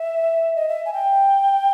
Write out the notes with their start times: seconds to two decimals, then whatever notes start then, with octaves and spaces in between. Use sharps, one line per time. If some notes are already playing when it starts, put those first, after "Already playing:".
Already playing: E5
0.56 D#5
0.69 E5
0.86 G#5
0.93 G5